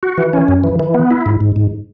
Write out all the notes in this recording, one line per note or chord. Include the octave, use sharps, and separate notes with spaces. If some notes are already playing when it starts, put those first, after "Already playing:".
F#4
E3
C#4
F#2
E3
E3
B3
E4
G#2
G#2
G#2